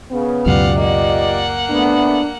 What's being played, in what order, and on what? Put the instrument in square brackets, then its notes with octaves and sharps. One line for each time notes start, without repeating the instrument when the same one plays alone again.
[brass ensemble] C#3 [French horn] B3
[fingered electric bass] C#2 F#2 B2 [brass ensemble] F4 G4 D5 [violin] F5 F#5
[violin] A#3 F#5 [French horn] D#5
[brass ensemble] A3 B3 [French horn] D4